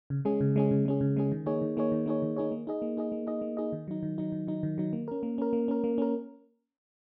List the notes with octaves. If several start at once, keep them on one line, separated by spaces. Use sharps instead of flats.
C#3
G#3 C#4 G#4
C#3
G#3 C#4 G#4
C#3
G#3 C#4 G#4
C#3
G#3 C#4 G#4
D#3
A#3 D#4 G#4 C#5
D#3
A#3 D#4 G#4 C#5
D#3
A#3 D#4 G#4 C#5
D#3
A#3 D#4 G#4 C#5
A#3
D#4 G#4 D#5
A#3
D#4 G#4 D#5
A#3
D#4 G#4 D#5
A#3
D#4 G#4 D#5
D#3
F#3 D#4
D#3
F#3 D#4
D#3
F#3 D#4
D#3
F#3 D#4
A#3
C#4 A#4
A#3
C#4 A#4
A#3
C#4 A#4
A#3
C#4 A#4